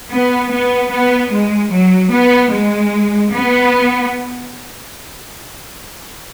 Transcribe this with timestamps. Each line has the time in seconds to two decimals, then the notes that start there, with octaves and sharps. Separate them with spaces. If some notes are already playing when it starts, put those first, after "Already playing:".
0.11 B3
0.51 B3
0.90 B3
1.31 G#3
1.71 F#3
2.11 B3
2.51 G#3
3.32 B3